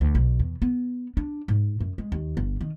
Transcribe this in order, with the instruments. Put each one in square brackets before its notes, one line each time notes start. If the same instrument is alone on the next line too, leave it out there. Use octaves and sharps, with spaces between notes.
[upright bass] D2
B1
E2
B3
D4
G#2
F#2
G#3
D#2
G1
D#3